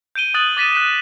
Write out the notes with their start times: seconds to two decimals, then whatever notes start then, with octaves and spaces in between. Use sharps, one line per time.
0.15 G6 D7 D#7 G7
0.34 D#6 F#6 A6 F#7
0.57 D6 A6 B6 D#7 E7
0.73 F#6 B6 E7